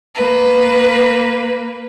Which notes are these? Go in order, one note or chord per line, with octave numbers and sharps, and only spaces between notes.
A#3 B4